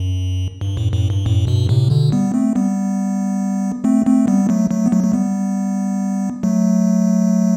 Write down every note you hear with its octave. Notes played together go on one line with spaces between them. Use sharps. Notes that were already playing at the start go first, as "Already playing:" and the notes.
Already playing: F#2
G2
F#2 A2
F#2 A2
G2
F#2 A2
G2 B2
A2 C3
B2 D3
G3 B3
A3 C4
G3 B3
A3 C4
A3 C4
G3 B3
F#3 A3
F#3 A3
B3
F#3 A3
A3
G3 B3
F#3 A3